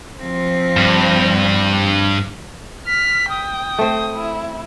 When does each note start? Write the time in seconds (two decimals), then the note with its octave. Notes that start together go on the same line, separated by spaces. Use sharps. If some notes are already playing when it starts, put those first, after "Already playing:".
0.19 F3 C4
0.77 G2
2.87 F6 B6
3.30 G5 D#6
3.79 A3 C4
4.14 E4